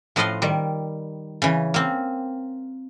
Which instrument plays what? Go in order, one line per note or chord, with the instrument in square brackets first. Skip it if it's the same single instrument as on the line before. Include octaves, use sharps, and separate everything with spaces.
[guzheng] A2 F3 B4 D#5 F5 C6
D#3 G3
C#3 E3
A#3 C4